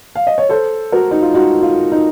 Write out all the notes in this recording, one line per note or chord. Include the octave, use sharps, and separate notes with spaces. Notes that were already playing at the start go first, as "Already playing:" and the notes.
F5
D#5
C#5
A4 C5
F#4 A#4
D#4
F4
D#4 F#4
F4
D#4